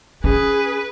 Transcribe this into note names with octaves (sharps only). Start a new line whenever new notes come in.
C#4 G#4 B4